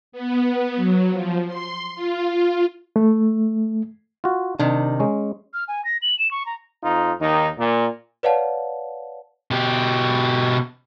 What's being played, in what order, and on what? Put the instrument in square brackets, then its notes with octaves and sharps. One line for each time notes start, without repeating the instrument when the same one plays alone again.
[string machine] B3
F#3
F3
C6
F4
[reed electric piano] A3
[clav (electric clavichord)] F4 F#4
[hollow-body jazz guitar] C3 D#3 [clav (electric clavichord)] D4
[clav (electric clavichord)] G#3 C#4
[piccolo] F6
G#5
A#6
F#7
E7
C#6
A#5
[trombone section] F2 D#4 F4
D#2 D#3 D#4
A#2
[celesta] B4 C#5 D5 F5 F#5 A5
[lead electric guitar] B2 G4